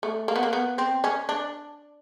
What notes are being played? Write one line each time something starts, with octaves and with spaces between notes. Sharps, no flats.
A3
A#3
B3
A#3
B3
C4
C#4
D4